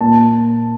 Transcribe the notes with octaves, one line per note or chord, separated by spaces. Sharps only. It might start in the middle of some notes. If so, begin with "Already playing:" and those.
A#2 A5